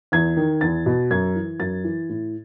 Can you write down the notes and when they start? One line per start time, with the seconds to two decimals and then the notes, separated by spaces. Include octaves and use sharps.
0.12 E2 G#6
0.37 D#3
0.61 E2 A6
0.86 B2
1.11 F#2 G#6
1.36 E3
1.60 F#2 A6
1.84 E3
2.09 A2